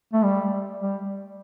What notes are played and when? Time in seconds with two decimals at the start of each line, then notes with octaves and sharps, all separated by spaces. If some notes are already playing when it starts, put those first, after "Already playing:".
0.13 A3
0.23 G3
0.80 G3